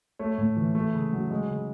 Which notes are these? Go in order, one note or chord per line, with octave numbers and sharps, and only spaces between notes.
A3 C#5
A2
E3
A3
C#3
F#3
G#3
C#3